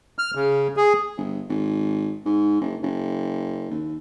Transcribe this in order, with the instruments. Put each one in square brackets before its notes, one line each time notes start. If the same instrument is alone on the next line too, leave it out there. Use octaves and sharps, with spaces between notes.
[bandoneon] F6
C#3
G#4
[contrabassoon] G1
G#1
G#2
F#1
F#1
D#2